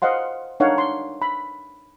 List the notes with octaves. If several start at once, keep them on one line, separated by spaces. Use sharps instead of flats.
C5 D#5 F5 F#5 C6
D4 D#4 A#4 C#5 F5 F#5
C6
B5